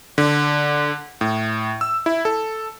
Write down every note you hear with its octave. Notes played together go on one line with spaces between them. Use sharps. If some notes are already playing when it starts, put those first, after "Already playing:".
D3
A2
E6
E4
A4